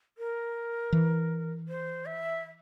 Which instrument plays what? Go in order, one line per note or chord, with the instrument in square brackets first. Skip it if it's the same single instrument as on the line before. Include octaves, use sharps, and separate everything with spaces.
[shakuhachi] A#4
[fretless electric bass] E3
[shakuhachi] C5
E5